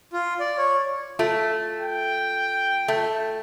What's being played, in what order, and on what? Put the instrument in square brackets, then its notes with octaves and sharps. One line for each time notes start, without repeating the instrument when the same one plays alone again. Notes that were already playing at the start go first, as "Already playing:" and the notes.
[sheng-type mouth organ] F4
D5
C#5
[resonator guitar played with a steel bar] A3 [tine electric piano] F4
[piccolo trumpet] G5
[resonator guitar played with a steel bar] A3